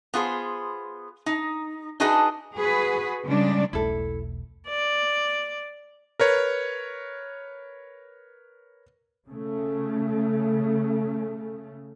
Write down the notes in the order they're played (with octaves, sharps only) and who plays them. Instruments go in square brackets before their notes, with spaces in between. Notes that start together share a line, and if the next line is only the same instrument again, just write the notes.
[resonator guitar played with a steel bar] B3 F4 G#4 C5
D#4
D4 D#4 F#4 G#4 B4 D#5
[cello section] F#4 G#4 B4
C#3 G3 G#3 D4 D5
[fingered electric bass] E1 B1 A3 [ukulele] E4 A4
[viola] D5
[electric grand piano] A#4 B4 C#5
[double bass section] C#3 A3